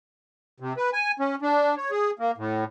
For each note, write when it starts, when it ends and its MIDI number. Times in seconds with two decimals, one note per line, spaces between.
0.60 0.73 48
0.77 0.90 71
0.93 1.12 80
1.20 1.35 61
1.42 1.75 62
1.77 1.91 73
1.91 2.11 68
2.19 2.31 58
2.38 2.64 45